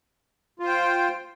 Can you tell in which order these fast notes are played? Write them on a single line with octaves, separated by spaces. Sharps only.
F4 C5 G5